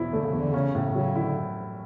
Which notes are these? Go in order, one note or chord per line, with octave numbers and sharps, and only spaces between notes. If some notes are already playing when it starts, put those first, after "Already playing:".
Already playing: E2 B2 E4
D3 A3
C#3
E2 D3
C#3 C#4
A2 C#3
C#3 F#3
D3 E4